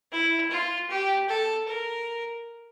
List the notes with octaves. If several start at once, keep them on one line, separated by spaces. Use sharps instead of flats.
E4
F4
G4
A4
A#4